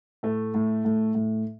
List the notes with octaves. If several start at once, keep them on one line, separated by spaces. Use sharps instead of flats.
A2 A3
A2
A2
A2